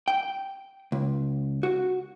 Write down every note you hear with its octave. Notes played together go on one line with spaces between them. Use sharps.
G5
C#2
F#4